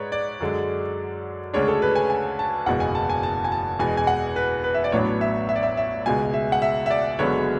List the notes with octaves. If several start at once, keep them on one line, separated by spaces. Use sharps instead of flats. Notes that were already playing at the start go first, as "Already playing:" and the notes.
Already playing: G#2 G#3 B4 C#5 D5
D5
F#2 D3 G#3
D2 C#3 G#3 D4 C#5
A4
B4
G#5
G#5
A5
F#1 E2 B2 G#3 F#5
G#5
A5
G#5
A5
G#5
A5
E2 B2 G#3 G#5
G#5
F#5
B4
B4
E5
D5
A1 A2 F#3 B3 D4 C#5
E5
E5
D5
E5
E5
C#2 B2 G#3 G#5
E5
F#5
E5
E5
D5
F#1 F#2 D3 G#3 B3 C#5